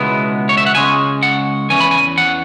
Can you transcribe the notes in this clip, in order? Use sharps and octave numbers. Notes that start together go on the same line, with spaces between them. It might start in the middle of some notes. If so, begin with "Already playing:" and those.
Already playing: C#2 B2 G#3 B3 E4
C#5
E5
F#5
C#2 C#3 G#3 C#4 G#5
F#5
E2 E3 C#4 G#5
B5
G#5
F#5